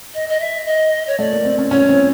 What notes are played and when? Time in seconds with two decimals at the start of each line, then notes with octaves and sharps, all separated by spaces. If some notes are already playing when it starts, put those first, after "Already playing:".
0.14 D#5
0.29 D#5
0.40 E5
0.66 D#5
1.07 C#5
1.19 A3 D5
1.31 A#3
1.45 C4
1.59 C#4
1.71 C#4 C#5
1.89 C4